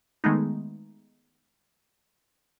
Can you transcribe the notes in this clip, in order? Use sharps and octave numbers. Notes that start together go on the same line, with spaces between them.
D#3 G#3 A3 B3 D#4